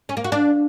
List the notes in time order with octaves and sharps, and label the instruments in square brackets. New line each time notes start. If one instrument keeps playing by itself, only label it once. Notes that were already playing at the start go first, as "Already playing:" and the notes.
[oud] C#4
A#3
F#4
D4